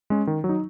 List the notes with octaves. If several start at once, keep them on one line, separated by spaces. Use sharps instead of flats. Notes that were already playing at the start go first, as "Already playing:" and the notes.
G#3 C#4
D#3
F#3
D#4